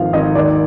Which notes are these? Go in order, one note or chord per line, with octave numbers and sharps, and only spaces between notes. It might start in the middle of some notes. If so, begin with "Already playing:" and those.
Already playing: G#1 F3 F5
G#1 D#5
D#2 D5